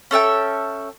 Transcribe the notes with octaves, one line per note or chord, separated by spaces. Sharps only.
C#4 A4 E5 G5